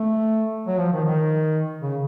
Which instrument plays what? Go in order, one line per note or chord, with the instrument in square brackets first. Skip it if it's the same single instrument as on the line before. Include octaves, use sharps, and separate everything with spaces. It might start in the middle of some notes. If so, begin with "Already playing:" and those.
Already playing: [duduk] A3
F#3
F3
D#3
D#3
C#3